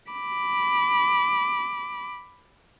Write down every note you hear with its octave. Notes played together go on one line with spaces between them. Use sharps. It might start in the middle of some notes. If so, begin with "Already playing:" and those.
B5 D6